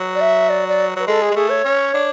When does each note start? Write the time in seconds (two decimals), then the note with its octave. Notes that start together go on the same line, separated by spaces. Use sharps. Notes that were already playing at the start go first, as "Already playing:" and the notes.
Already playing: F#3
0.15 D5
0.21 E5
0.49 D5
0.68 D5
0.96 F#3 B4
1.07 G#3 A4
1.22 G#4
1.31 G#3
1.36 A3 G#4
1.50 C#5
1.65 C#4
1.94 D4